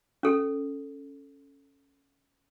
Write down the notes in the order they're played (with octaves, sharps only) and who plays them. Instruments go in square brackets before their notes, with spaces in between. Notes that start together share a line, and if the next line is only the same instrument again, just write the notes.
[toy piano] C#4 A4